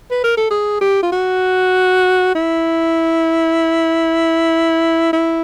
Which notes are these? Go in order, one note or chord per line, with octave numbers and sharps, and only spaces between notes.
B4
A#4
A4
G#4
G4
F4
F#4
E4
E4